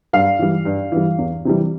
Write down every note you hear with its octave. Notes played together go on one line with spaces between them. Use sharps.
G2 F5
E3 G3
G2
E3 G3
E2
C3 E3 G3